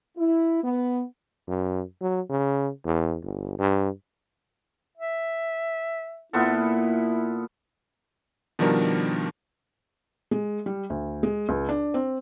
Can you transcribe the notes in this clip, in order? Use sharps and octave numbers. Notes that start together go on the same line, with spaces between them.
E4
B3
F#2
F#3
C#3
E2
G1
G2
E5
A#2 B3 E4 A4
B2 D#3 F3 G3 D4 A#4
G#3
G3
D2
G#3
C#2
D4
C4